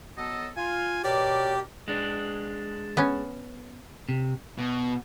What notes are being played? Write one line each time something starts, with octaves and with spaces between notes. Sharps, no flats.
F#3 B3 A4 D#5
F4 G#5
B2 G4 A#4 C#5 D5
G#3 D4
B3 C#4
C3
B2